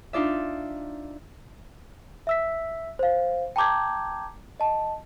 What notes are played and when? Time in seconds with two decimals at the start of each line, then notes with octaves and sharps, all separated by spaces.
0.13 D4 D#4 F4 D5 E5
2.27 E5 E6 B6
2.99 C5 F5
3.56 G5 A5 A#5 D6 G6 G#6
4.60 D#5 A5